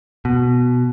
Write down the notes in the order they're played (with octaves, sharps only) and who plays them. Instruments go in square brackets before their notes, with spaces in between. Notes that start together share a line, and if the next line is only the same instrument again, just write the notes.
[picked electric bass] B2